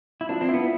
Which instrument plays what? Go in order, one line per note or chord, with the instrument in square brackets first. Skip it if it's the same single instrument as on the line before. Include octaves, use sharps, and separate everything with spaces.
[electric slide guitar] E4
[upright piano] F3 [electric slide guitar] D4
[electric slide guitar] C4
[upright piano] E4
[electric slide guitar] B3